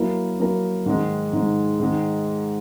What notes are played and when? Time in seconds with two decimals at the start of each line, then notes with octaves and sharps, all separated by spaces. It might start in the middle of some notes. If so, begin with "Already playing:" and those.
Already playing: F#3 A#3 E4 A#4
0.39 F#3 A#3 E4 A#4
0.86 G#2 D#3 G#3
1.33 G#2 D#3 G#3
1.79 G#2 D#3 G#3